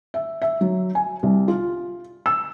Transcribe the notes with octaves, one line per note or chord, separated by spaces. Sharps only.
E5
E5
F#3
G#5
C2
F4
E6